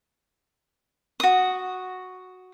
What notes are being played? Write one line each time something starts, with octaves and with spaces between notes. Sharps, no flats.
F#4 D#6